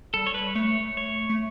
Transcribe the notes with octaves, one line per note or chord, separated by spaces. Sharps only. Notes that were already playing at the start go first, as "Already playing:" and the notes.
G3 A4
C#5
B4
A3 C#5
C#5
A3